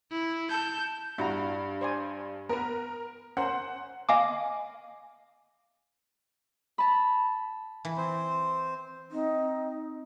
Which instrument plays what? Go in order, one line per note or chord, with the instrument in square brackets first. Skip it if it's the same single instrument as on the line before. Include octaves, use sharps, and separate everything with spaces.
[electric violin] E4
[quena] A5 [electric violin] G6
[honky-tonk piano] G2 [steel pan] E4 F#4 A#5
[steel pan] C5 D5 G#5
[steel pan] B3 B4 [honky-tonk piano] A#4
[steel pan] C#4 A#4 C5 [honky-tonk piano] F#5
[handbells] D#5 F5 G#5 D6
[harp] A5 B5
[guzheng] E3
[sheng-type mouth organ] C4 C5
[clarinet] C4 [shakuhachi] D#4